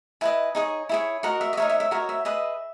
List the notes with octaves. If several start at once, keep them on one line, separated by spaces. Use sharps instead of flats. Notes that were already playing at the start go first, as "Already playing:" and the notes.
E4 B4 D#5 G#5
D#4 G#4 C#5
E4 G#4 C#5
F#4 A#4 D#5 F#5
E5
D#5
D#4 A#4 C#5 E5
E5
E5
F#4 A#4 C#5 D#5
E5
G#4 B4 D#5 E5